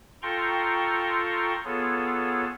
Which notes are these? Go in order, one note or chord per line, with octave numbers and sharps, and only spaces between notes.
F4 A4 G5 A#5 C6 C#6
B3 F4 G#4 A4 C#5